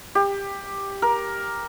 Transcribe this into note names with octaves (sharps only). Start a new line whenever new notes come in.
G4
A#4